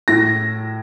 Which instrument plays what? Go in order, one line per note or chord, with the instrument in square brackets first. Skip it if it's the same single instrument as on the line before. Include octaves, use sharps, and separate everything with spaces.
[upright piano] A2 A#6